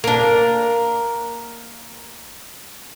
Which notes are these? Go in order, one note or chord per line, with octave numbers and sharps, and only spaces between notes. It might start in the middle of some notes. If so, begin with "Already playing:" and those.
A#3 D4 A#4